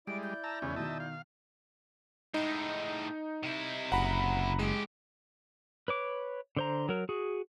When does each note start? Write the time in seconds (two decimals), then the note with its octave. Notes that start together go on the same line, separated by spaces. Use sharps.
0.07 G3 G#3 E4 D5 D7
0.23 G6
0.44 A5 A#5 E6
0.62 F1 E2 C#3 E3 C#4
0.76 B2 D#3 D#5 E5 A5
1.00 F5
2.34 A2 G#3 D#4
3.43 C3 E4
3.92 F#1 F#5 A#5 B5
4.59 A2 G#3 G4
5.88 B4 C#5 D6
6.57 D3 C5 A#5
6.89 F#3 A#4
7.09 F#4 G#4